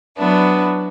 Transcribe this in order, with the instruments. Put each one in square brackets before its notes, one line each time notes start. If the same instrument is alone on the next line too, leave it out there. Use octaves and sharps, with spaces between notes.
[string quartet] F#3 B3 D4 E4